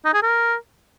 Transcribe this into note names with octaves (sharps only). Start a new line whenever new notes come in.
D#4
G#4
A#4